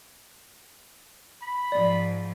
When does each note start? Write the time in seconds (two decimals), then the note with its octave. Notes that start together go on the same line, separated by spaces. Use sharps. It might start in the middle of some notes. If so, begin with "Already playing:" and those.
1.42 B5
1.72 G#2 F3 D5